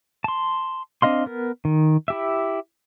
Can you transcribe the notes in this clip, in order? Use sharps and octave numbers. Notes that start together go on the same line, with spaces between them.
A5 C6
C4 D4 D#5 F5 C6
B3 A#4
D#3
E4 G4 E5